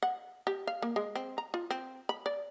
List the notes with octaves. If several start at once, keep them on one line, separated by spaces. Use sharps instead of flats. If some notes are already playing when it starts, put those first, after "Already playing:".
F#5
G4
F5
A#3
G#3
C4
A#5
F4
C4
B5
D5